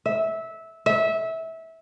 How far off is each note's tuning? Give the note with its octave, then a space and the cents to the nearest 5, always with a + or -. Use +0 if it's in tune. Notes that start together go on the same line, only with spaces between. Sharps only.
E5 -15
E5 -20